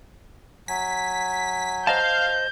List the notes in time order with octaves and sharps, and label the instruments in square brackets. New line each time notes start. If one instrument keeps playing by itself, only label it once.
[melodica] F#3 G#5 [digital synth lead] B6
[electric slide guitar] C5 D#5 A5 [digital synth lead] F5 [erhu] G6